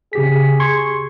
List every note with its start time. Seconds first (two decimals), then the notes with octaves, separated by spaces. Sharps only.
0.13 C#3 G4 G#4 B6
0.60 C6 C#6 G#6